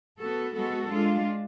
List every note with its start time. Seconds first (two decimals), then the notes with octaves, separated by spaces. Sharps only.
0.20 B3 F#4 A4
0.56 G#3 B3 F#4 A4
0.90 G#3 D4 F4